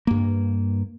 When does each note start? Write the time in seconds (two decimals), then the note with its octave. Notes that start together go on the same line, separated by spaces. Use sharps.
0.07 G2 A#3